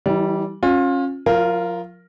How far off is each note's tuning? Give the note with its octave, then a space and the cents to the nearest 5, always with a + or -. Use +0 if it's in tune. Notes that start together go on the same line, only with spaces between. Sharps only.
E3 +0 G3 -15 D#4 +45
C#4 -25 F4 +25
F3 +45 F4 -20 A#4 +0